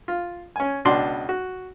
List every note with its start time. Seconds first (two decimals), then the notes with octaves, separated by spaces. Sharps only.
0.08 F4
0.56 C#4 G#5
0.85 C#2 B2 D4 D5 C6
1.29 F#4